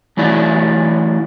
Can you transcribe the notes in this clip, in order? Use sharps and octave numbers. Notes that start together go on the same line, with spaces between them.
E3 F#3 A3 E4 D5